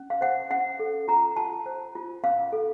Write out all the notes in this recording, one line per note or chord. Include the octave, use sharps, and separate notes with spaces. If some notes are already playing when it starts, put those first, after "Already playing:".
Already playing: C#4
F5
C5 F#5
C#4 F#5
A4
F4 A#5
F4 A5
C5
F4
C#4 F5
A4